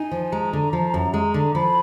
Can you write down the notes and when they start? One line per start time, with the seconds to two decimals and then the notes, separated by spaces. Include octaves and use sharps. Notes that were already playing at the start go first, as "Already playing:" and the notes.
Already playing: D#4 G#5
0.11 F3
0.32 G#3 A#5
0.53 D3
0.73 F3
0.94 F#2
1.14 G#3
1.34 D3
1.55 F3 B5